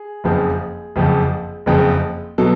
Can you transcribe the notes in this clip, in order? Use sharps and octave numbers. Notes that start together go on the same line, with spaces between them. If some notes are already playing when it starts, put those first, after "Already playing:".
Already playing: G#4
F#1 F2 C#3 F3
F#1 F2 C#3 F3
F#1 F2 C#3 F3
B2 F#3 A4